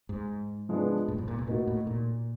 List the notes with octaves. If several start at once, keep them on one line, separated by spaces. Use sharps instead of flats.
G#2
F3 G#3 B3 D4
A2
G#2
A#2
B2
A2 A#3 D#4 F#4
A2
A#2